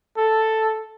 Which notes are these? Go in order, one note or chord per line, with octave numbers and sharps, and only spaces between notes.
A4